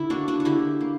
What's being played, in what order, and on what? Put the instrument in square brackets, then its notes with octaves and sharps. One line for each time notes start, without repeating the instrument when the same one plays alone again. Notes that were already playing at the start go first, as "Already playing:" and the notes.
Already playing: [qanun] D3 E4
A#3 D4 F#4
D4 F#4
F#4
D3 E4 G4
A#3